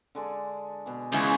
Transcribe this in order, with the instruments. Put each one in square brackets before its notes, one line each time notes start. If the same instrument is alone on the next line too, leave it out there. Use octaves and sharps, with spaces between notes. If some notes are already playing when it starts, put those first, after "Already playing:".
[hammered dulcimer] D3 G#3 D4
B2 G#4
[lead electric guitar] C#2 [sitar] C#3 E3 G#3 [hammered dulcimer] E4 F5